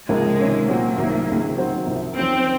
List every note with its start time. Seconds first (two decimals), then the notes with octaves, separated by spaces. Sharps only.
0.08 C#2 C3 F3 G#3 A#3
0.39 C3 D#3 A#3 C#4
0.68 A#2 F#3 A#3 C4 F#4 C5
0.97 C2 C3 D#3 F#3
1.27 C#2 C3 D#3
1.56 D#3 F#3 C4 F#4 C5
1.86 C2 C3 F3
2.16 F2 D#3 F#3 C4 C#4